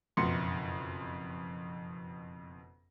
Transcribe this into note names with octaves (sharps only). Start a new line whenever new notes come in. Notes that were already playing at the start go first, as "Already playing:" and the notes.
F#1 F2 B2 C6 C#7